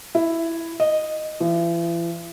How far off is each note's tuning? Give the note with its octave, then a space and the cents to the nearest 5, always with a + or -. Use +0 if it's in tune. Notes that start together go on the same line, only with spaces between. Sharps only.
E4 +5
D#5 -10
E3 +45